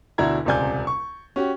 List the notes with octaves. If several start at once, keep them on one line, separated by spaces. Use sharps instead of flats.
D2 B2 D4 E4 A#5 G#6
D#1 C#2 C3 D5 G#5 G6
C#6
C#4 F#4 G4